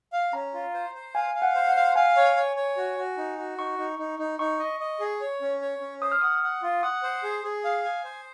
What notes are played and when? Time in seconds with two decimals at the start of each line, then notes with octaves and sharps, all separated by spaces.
0.13 F5
0.33 C#4 A#5
0.54 F4
0.74 C5
0.95 C5
1.15 F5 G#5
1.35 F5
1.42 F#5
1.55 C5
1.68 F#5
1.76 F5
1.96 F5 G#5
2.16 C#5
2.36 C#5
2.56 C#5
2.77 F#4
2.97 F#4
3.17 D#4
3.38 F#4
3.58 D#4 C#6
3.78 D#4
3.99 D#4
4.19 D#4
4.39 D#4 C#6
4.59 D#5
4.80 D#5
5.00 G#4
5.20 C#5
5.41 C#4
5.61 C#5
5.81 C#4
6.02 C5 D#6
6.12 F6
6.21 F#5 D#6
6.43 F#5
6.63 F4
6.83 F#5 D#6
7.03 C5
7.23 G#4
7.44 G#4
7.64 F5
7.85 G#5
8.04 C5